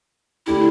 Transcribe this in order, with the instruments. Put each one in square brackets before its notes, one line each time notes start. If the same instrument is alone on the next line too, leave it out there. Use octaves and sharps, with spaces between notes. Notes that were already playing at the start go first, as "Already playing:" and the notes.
[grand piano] D3 A3 D4 G4 [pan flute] E4